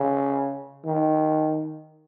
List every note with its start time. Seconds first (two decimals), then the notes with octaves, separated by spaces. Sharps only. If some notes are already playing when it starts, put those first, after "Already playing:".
Already playing: C#3
0.85 D#3